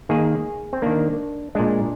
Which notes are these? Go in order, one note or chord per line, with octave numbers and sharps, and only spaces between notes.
D#3 A#3 G#4
C4
D#3 A#3 D4
A#2 G#3 D4